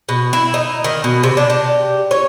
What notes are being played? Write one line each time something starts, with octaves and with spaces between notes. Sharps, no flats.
B2
E4
D#4
D#3
B2
C3
D4
G4
C#5